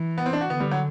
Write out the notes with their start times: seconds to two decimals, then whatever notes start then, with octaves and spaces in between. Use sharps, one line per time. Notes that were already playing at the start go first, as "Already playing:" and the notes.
Already playing: E3
0.18 B3
0.26 C4
0.33 D4
0.41 F#4
0.50 D3 B3
0.60 G3
0.71 F#3